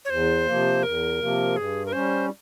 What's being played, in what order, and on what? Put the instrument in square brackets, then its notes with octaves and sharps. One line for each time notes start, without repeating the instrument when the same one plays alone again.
[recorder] C#5
[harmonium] E2 [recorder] C5
[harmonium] C3 F3 A#3
[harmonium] E2 [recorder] A#4
[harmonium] C3 F3 A#3
[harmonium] G2 [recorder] G#4
[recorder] A#4
[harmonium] G3 C#4 [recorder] C5